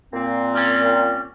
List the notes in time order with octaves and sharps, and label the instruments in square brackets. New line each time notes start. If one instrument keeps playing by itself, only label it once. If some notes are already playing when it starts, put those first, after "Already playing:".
[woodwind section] A#2 C4
[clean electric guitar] G3 C#4